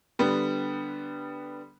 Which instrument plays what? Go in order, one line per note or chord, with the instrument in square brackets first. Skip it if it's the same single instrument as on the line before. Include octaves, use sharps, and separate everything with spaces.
[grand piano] D3 G3 B3